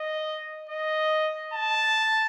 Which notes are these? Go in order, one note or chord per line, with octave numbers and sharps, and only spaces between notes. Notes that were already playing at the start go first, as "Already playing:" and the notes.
Already playing: D#5
D#5
A5